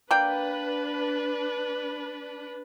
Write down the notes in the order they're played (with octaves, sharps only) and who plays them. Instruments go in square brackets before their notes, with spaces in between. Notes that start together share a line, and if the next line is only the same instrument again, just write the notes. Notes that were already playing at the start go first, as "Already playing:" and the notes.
[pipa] A#3 D5 G5 [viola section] D4 B4